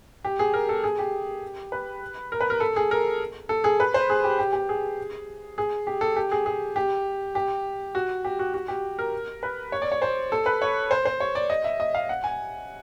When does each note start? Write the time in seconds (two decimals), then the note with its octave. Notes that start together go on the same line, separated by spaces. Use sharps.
0.25 G4
0.39 G#4
0.54 A#4
0.69 A4
0.84 G#4
0.99 G4
1.72 B4
2.32 A#4
2.41 B4
2.50 A#4
2.60 A4
2.76 G#4
2.91 A#4
3.49 A4
3.64 G#4
3.80 B4
3.94 C5
4.10 G#4
4.24 G4
4.39 G4
4.53 G4
4.69 G#4
5.58 G#4
5.87 G4
6.01 A4
6.16 G4
6.31 G#4
6.46 G#4
6.76 G4
7.35 G4
7.95 F#4
8.25 G4
8.39 F#4
8.54 F#4
8.68 G4
8.99 A#4
9.43 B4
9.72 C#5
9.82 D5
9.92 C#5
10.02 C5
10.32 A4
10.46 B4
10.62 C#5
10.91 C5
11.05 C5
11.20 C#5
11.35 D5
11.50 D#5
11.64 E5
11.80 D#5
11.94 F5
12.09 F#5
12.24 G#5